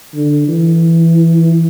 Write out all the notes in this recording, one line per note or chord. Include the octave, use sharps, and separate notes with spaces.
D3
E3